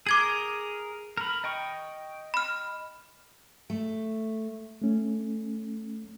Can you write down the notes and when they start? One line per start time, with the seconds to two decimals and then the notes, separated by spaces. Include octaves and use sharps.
0.07 G#4 A#4 D6 G#6 F#7
1.17 A#4 B5
1.44 D#5 G5 C#6
2.34 B5 F6
3.70 A3
4.82 A3 C#4